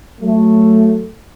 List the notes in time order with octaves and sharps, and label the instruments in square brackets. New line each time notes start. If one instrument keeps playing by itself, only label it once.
[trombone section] F#3 A3